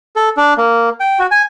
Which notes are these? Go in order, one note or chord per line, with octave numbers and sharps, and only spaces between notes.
A4
D4
A#3
G5
F#4
G#5